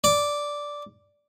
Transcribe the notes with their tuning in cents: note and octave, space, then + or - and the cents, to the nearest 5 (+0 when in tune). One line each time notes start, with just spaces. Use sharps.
D5 -5